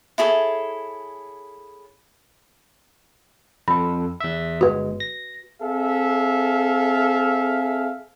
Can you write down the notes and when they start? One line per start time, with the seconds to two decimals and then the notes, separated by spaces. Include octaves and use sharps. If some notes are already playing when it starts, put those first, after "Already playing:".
0.18 E4 G#4 A4 C#5
3.68 F2 A4 B5
4.20 E2 E5
4.61 G1 G#3 F#4 B4
5.00 A#6
5.62 C4 G#4 A4 E5 F5